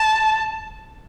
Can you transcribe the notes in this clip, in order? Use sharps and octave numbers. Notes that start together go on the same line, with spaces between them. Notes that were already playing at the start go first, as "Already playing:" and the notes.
Already playing: A5